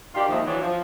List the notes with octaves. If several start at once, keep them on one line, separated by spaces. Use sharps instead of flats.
D#3 D4 F4 G4
D#2 D#3 F3 G#3 D#4 E5
E3 F#3 D4
F3